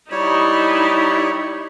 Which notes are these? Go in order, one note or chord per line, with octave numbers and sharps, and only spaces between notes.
G3 D#4 E4 C#5